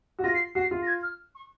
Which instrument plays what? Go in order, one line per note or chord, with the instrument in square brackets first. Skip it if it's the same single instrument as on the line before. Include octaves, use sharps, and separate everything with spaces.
[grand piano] F#4
[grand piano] F4 [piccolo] A#6
[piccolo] C7
[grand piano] F#4 [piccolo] C7
[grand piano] F4
[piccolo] A#6
G#6
F6
C#6